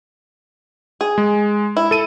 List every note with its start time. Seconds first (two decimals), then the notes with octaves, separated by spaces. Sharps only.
1.01 G#4
1.18 G#3
1.77 E4
1.91 A4 D#7